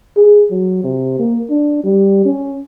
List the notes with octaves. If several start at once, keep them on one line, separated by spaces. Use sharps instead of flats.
G#4
F#3
C3
A#3
D4
G3
C#4